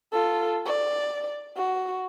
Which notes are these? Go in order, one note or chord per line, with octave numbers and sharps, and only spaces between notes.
F4 A4
D5
F#4